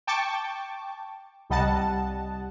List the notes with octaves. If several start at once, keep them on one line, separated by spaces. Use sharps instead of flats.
G5 A5 C#6 D6
C2 G3 D#5 F#5 A5